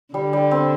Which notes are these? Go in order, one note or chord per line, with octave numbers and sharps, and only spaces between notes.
D3 G3
G3
C4